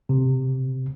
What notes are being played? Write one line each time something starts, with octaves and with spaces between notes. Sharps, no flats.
C3